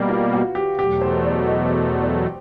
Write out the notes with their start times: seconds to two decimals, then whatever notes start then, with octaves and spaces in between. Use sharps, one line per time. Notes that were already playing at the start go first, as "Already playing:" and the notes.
Already playing: B2 G3 A#3 B4
0.09 F4
0.33 F#4
0.55 G4
0.79 E2 B2 F#3 A3 G4
1.01 C5
1.25 D5
1.48 D#5
1.72 D#5
2.02 D5